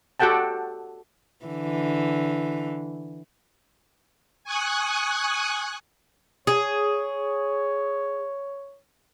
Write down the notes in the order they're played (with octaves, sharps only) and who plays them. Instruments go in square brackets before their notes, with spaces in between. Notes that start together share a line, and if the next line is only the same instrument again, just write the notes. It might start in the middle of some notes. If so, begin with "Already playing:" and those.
[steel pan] F#4 G4 A4 F#5 G5 A5
[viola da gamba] D3 E3
[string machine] G#5 C#6 D#6 F#6
[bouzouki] G#4 [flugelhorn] C#5